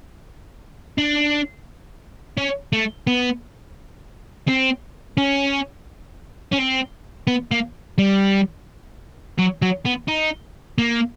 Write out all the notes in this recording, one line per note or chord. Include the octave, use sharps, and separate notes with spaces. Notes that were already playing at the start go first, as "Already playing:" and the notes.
D4
C#4
A3
B3
C4
C#4
C#4
C4
B3
A#3
G3
F#3
F#3
B3
D#4
A#3